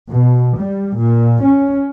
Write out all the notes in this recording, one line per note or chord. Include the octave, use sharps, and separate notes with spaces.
B2
G3
A#2
C#4